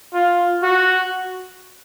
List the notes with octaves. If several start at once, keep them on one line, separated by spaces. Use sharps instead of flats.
F4
F#4